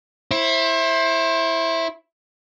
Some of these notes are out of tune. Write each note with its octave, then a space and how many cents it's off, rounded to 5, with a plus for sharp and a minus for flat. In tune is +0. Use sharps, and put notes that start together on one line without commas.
E4 +0 C5 +30